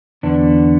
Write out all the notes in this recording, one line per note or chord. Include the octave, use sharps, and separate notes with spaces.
E2 D3 B3 D4